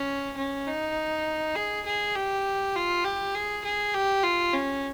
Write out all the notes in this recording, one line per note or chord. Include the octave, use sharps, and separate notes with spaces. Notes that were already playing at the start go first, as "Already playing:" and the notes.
Already playing: C#4
C#4
D#4
G#4
G#4
G4
F4
G4
G#4
G#4
G4
F4
C#4